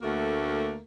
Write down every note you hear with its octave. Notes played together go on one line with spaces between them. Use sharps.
D2 A3 A#3 F#4 A#4